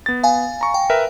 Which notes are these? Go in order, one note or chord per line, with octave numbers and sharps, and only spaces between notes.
B3 A6
F5 G#5
A#5 C#6
G5
A#4 B4 E5